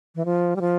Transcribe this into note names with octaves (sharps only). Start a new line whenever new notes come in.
E3
F3
G3
F3